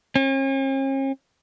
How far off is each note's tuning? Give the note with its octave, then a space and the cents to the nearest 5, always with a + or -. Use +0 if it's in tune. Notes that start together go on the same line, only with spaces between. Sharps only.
C#4 -45